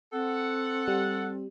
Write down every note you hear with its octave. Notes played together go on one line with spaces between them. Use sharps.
C4 A4 F#5
G3